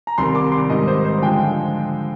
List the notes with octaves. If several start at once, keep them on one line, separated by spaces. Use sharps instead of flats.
A#5
C2 C3 D#3 G3 C6
D6
C6
G#2 D#3 G3 D#5
C5
C5
D3 F3 G#3 G5